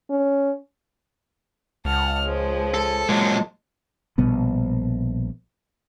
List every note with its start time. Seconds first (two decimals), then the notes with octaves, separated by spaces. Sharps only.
0.10 C#4
1.85 C#2 F#5 A5 F6
2.23 F3 G#3
2.74 A4
3.09 A#2 F#3 G#3 A5
4.18 A#1 B2 G3 B3